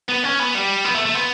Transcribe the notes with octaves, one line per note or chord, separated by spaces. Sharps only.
B3
C#4
B3
G3
B3
A3
A3
B3